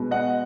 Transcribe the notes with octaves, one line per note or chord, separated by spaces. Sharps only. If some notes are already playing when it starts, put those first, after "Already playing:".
Already playing: B2 G#3 B3
D#5 F#5